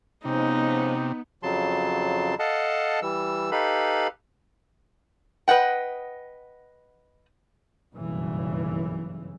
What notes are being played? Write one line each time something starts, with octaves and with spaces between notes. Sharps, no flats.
C3 F3 G#3 B3 C#4 D#4
F2 C#3 F#3 A5 C6
A4 D#5 F5 F#5 A5
E3 G3 E6
D#4 G4 A4 B4 F5 B5
B4 D#5 F#5 G5
F#1 B1 G2 C#3 E3